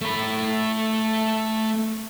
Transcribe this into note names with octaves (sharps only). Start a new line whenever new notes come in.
A3 B5